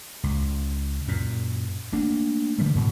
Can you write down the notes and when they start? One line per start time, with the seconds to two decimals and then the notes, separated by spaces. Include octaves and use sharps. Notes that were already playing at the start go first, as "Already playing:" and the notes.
0.24 C#2
1.08 F#2 A#2
1.93 A3 A#3 D4
2.58 D3 F3 G3 A3
2.76 G#2 B2 D3 G3